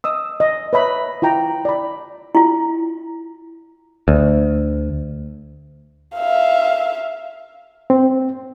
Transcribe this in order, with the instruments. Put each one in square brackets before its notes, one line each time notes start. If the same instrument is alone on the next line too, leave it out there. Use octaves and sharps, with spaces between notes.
[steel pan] D#5 D#6 E6
D#5
B4 C#5 D#5 E5 A#5 B5
E4 F4 G5 A#5
D5 B5
[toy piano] E4 F4
[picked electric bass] D2
[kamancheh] E5 F5
[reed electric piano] C4